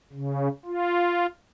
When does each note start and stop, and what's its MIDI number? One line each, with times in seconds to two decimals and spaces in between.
0.13 0.49 49
0.65 1.26 65